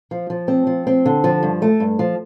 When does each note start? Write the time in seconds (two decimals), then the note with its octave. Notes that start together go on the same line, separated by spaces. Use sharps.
0.11 F3
0.30 F3
0.48 C4
0.67 F3
0.87 C4
1.06 D3
1.24 F3
1.43 G2
1.62 A3
1.80 G2
1.99 F3